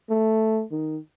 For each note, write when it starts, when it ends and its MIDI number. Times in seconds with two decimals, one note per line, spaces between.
0.10 0.63 57
0.71 0.99 51